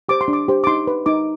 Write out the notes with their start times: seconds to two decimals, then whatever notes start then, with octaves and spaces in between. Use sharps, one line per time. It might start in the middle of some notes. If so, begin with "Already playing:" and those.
0.09 G4 C5 D6
0.21 C6
0.28 D4
0.33 D6
0.48 G4 C5
0.64 D6
0.67 D#4 C6
0.87 B4
1.06 D#4 D6